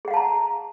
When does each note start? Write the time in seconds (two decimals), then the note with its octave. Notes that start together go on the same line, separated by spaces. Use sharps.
0.05 G#4
0.08 F#5
0.11 F5
0.14 A5
0.17 A#5